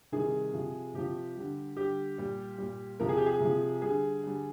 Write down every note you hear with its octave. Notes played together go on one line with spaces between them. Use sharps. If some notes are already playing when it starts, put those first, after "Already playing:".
C3 D#3 G3 G#4
C3 F3
C3 F3 G4
D3 G3
D3 G3 G4
A#2 G3
A#2 G3
C3 F3 A#4
G#4
G4
G#4
C3 F3
D3 G3 G#4
D3 G3